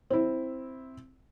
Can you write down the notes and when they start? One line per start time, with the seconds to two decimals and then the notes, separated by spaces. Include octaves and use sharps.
0.10 C4 E4